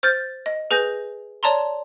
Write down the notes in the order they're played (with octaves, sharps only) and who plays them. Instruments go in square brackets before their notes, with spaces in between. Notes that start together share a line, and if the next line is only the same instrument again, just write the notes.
[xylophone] C5 F6 G6 A6
D#5
G#4 B4 G#5 G6 A#6
C#5 D5 A5 A#5 C6